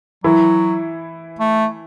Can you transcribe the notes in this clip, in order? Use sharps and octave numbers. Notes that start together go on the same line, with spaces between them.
E3 F#3 E4
A3